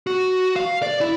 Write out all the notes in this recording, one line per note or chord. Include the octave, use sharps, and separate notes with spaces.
F#4
F5
D5
E4